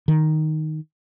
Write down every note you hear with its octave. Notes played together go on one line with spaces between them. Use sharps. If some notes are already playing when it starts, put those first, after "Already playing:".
D#3